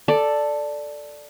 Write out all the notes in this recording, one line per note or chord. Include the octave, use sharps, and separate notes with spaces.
A4 D5